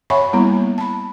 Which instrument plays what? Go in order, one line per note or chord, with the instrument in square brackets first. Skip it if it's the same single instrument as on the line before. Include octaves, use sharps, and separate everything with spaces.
[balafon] C#5 E5 F#5 G#5 B5 C#6
G3 A#3 B3 E4
A5 B5